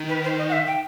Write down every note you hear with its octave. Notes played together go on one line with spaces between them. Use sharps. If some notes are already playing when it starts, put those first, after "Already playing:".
Already playing: D#3
B4
C5
D#5
F#5
E5
G5